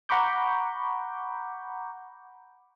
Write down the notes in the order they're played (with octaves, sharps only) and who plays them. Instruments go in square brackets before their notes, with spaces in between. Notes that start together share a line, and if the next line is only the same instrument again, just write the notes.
[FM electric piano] F#5 A#5 B5 C#6 D6 G6